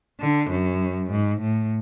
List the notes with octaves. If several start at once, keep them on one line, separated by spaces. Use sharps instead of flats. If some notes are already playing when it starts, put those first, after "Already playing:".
D3
F#2
G#2
A2